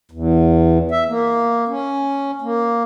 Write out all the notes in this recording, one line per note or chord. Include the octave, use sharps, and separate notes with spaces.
E2
E5
A#3
C#4
A#3